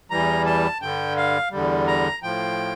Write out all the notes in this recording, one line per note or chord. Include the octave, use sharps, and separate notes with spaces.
E2 E3 G3 A#5
A5
G2 D3 G3 G5
F5
E2 D3 G3
A#5
A2 F3 G5